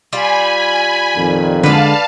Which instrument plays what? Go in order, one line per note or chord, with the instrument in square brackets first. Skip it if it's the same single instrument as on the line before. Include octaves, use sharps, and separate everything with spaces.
[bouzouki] G3 F4 [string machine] G#5 B5
[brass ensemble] F2 A#2 D#3
[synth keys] D3 G#3 [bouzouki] B4 D5 [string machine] F5 A5